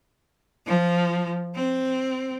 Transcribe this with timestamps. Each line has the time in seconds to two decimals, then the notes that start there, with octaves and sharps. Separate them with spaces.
0.67 F3
1.55 C4